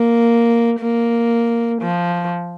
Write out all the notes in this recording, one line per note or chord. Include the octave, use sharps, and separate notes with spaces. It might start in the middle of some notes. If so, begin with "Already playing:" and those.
Already playing: A#3
A#3
F3